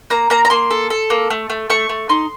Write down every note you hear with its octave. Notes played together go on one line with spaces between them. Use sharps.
A#3 A#5
A#3 A#5
A#5
A#3 C6
A4
A4
A#3
A3
A3
A3 C#6
A3
D#4 C6